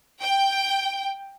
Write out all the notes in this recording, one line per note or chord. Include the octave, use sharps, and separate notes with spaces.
G5